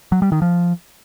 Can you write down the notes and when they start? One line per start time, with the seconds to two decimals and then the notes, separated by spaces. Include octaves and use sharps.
0.12 F#3
0.22 G3
0.32 D#3
0.42 F3